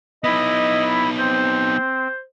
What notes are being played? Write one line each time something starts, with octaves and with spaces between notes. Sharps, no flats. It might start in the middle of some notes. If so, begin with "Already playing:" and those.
B3 D#4 E4 D#5 B5
C4 C5